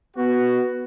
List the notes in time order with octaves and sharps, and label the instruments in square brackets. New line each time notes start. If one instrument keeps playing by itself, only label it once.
[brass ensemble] B3 F#4